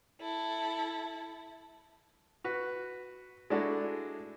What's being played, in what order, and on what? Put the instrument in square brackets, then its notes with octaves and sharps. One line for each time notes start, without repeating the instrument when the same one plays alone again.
[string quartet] E4 A4
[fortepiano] F#4 B4
G#3 A3 D4 E4 F#4 A4